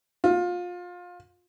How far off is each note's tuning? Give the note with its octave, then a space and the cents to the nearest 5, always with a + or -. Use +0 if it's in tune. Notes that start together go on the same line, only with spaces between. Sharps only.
F4 +25